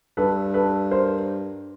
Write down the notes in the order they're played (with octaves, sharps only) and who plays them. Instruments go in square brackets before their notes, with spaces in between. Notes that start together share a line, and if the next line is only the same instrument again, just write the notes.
[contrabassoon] G2 [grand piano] A4 B4
[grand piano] A4 B4
A#4 C5